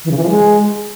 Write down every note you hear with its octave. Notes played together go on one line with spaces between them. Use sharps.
E3
C#3
E3
F3
G#3